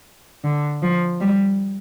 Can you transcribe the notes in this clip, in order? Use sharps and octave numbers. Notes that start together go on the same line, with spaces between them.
D3
F3
G3